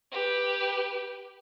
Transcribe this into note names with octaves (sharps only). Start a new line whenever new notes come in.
G4 B4